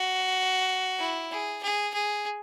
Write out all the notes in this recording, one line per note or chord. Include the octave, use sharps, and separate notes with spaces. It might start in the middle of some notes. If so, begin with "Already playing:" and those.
Already playing: F#4
E4
G#4
G#4
G#4